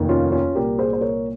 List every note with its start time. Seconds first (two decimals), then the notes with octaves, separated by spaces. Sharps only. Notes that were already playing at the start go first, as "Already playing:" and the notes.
Already playing: F1 D#2 D#3
0.09 C#4 F4
0.32 C#4 F4
0.55 C2 A#2 G4 A#4
0.78 G#4 C5
0.93 C5
1.01 A#4 C#5